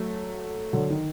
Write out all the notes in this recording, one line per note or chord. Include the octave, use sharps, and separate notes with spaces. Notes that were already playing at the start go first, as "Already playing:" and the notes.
Already playing: F#3 A3
D3 F#3
D#3